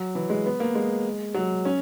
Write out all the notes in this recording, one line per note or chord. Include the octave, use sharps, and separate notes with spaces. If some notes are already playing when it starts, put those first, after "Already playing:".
Already playing: F#3
E3
G#3
B3
A#3
G#3
F#3
C#4